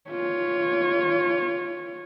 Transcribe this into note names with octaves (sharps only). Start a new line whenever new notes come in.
F4 C#5